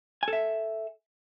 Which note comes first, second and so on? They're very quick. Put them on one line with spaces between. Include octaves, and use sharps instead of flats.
G#5 A4 E5